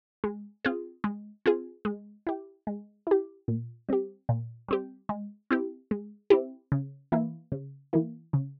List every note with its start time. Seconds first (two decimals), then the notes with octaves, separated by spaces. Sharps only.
0.24 G#3
0.65 C4 F4 G#4
1.04 G#3
1.46 C4 F4 G#4
1.85 G#3
2.27 E4 G4
2.67 G#3
3.07 E4 G4
3.48 A#2
3.89 G3 C4 G4
4.29 A#2
4.68 G3 C4 G4
5.09 G#3
5.51 C4 E4 G4
5.91 G#3
6.30 C4 E4 G4
6.72 C#3
7.12 E3 A#3 E4
7.52 C#3
7.93 E3 A#3 E4
8.33 C#3